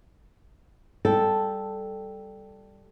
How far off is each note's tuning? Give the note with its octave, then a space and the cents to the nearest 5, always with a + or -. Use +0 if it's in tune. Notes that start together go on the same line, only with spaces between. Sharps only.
G3 +0 A4 -5 G5 +0